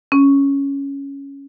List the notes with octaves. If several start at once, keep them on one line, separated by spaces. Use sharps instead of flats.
C#4